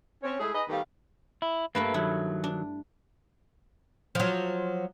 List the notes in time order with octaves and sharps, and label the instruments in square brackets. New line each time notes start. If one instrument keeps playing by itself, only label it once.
[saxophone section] C4 C#4 C#5
G#3 A3 E4 G#4
D#4 G#4 B4 D#5
D#3 G3 A3 B3 G4 F5
[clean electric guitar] E4
[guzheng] G2 A3 E5 [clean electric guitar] A#3 B4
[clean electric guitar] D#3 F#3 [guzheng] E4
[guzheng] D4
[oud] F3 F#3